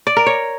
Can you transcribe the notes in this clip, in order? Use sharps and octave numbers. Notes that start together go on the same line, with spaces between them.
D5
A#4
C#5